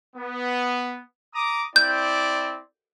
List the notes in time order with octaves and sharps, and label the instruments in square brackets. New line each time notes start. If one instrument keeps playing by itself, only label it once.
[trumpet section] B3
A#5 D6 D#6
[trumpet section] C4 E4 D5 [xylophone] G6